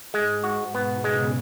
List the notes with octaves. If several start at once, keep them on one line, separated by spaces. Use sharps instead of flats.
G#2 G#3
F#4
B2 B3
C#3 G#3